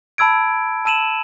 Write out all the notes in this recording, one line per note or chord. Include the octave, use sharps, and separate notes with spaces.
A5 B5 E6 G#6 D7
A5 E6 D#7 E7 F#7